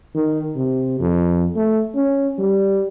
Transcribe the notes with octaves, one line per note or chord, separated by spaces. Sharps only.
D#3
C3
F2
A3
C#4
G3